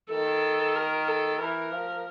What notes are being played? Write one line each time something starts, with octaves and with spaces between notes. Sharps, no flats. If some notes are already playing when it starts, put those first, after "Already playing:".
D#3 A4
A#4
A4
E3 A#4
F3